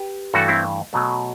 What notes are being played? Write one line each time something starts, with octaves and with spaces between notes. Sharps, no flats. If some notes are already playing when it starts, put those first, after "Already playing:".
Already playing: G4 B4
G2 E3 A3 F#4 A4
C4 E4
B2 F#3 A3